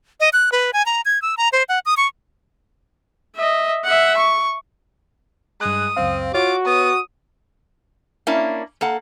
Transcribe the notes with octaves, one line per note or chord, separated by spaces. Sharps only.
D#5
F#6
B4
G#5
A#5
G#6
E6
A#5
C5
F#5
D#6
C#6
D#5 E5
E5 F#5
C#6
G2 G#3 D#6 F#6
C#2 F#2 C4 F5
F4 F#4 C#5 D6
B3 D#6
A#3 C#4 D4 E4
A#3 A4 F#5